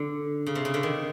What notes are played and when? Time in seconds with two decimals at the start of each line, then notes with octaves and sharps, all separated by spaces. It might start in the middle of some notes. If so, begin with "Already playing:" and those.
Already playing: D3
0.46 C#3
0.55 C3
0.65 C#3
0.74 D3
0.83 D#3